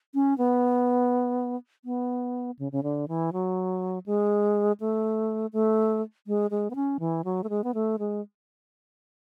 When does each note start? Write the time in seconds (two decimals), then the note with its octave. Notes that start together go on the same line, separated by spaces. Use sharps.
0.14 C#4
0.38 B3
1.85 B3
2.59 C#3
2.72 C#3
2.83 D3
3.08 E3
3.33 F#3
4.06 G#3
4.80 A3
5.53 A3
6.27 G#3
6.51 G#3
6.70 B3
6.75 C#4
7.00 E3
7.25 F#3
7.44 A3
7.50 G#3
7.64 B3
7.74 A3
7.99 G#3